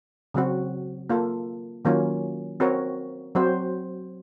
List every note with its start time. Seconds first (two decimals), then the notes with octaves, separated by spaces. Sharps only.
0.34 C#3 F#3 C4 F#4
1.09 A#3 F4 A4
1.85 D#3 F#3 A#3 C#4 F4
2.60 C4 F#4 A#4 C#5
3.35 F#3 C4 F#4 C5